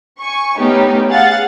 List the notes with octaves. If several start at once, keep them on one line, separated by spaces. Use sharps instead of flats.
G#5 C#6
A3 B3 C#4 D#4 G4
G#4 F5 F#5 A6